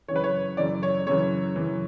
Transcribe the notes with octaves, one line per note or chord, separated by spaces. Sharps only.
F#2 C#3 E3 B4 C#5
C#5
F#2 C#3 E3 D5
C#5
F#2 C#3 E3 C#5
F#2 C#3 E3